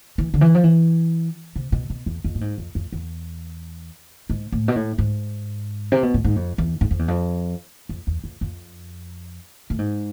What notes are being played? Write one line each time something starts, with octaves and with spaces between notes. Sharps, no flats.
E3
D3
E3
F3
E3
C3
B2
B2
E2
F2
A2
G#2
F2
F2
E2
G#2
A2
B2
A2
G#2
C3
B2
A2
G#2
F2
E2
G#2
F2
E2
F2
F2
E2
F2
F2
A2
G#2